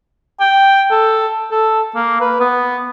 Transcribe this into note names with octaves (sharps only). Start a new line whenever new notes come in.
G5
A4
A4
A#3
B4
B3